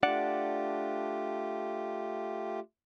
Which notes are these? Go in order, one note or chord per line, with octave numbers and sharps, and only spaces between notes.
A3 D4 F4 G4 D5 F#5